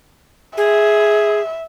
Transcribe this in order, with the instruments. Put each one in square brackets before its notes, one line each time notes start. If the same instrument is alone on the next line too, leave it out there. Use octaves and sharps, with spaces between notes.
[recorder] G#4 [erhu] E5